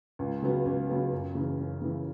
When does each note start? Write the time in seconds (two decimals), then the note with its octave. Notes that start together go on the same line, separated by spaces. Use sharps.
0.19 C#2
0.42 C#3 F#3 B3
0.65 C#2
0.89 C#3 F#3 B3
1.12 F#2
1.35 C#3 E3
1.59 F#2
1.82 C#3 E3